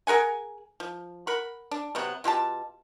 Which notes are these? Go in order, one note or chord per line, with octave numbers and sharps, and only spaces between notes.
G#4 A#4 F#5 G#5
F3
A#4 F#5 B5
D4
C3 F#3 B3
B2 F4 G4 A5